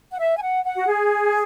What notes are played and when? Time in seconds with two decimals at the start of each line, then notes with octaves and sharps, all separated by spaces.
0.11 F#5
0.20 E5
0.38 G#5
0.42 F#5
0.64 F#5
0.76 F#4
0.86 G#4